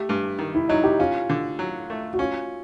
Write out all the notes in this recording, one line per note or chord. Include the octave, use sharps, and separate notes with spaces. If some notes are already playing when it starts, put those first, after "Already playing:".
Already playing: A3 G4
G2
D#3
E4
F#3 D#4
G4
C#4 F4
D3
F#3
A3
F#4
C#4 F4